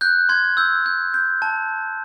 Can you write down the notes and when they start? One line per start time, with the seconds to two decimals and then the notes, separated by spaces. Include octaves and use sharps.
0.01 F#6 G6
0.29 C6 G#6
0.57 E6 G6
0.86 G6
1.14 G6
1.42 A5